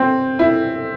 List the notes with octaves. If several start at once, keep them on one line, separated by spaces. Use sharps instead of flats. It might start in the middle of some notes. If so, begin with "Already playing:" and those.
Already playing: C4
E4